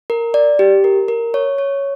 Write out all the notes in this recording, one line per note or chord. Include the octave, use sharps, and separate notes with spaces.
A#4
D5
G4
A#4
A#4
C#5
C#5